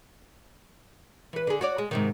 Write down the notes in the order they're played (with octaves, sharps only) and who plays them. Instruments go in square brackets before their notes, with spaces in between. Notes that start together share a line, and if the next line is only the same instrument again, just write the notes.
[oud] E3 B4
D3 G#4
F#4 C#5 D5
G#3
G#2 C3 D#3